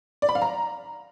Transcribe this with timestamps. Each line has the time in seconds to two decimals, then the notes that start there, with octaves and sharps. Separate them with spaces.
0.22 D5
0.29 B5
0.35 F5
0.42 A#5